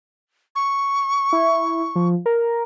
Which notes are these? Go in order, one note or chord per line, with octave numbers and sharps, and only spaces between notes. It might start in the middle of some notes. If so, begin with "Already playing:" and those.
C#6
E4
F3
A#4